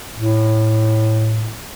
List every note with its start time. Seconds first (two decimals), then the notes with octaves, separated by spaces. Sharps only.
0.15 A2